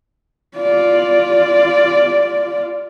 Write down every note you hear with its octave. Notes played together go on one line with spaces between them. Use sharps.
F4 D5